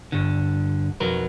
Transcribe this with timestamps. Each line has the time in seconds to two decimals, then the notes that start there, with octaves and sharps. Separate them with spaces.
0.12 G2 D3
1.00 B1 F2 F#3 A#4 B4